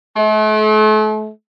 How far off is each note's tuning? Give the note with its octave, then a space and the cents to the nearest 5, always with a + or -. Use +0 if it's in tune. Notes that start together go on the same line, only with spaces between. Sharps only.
A3 -40